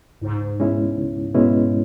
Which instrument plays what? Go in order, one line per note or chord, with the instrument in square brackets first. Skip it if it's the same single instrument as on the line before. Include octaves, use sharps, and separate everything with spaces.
[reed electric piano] C#2 [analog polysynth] G#2
[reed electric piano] B2 G#3 C#4 E4
C#2
B2 G#3 C#4 E4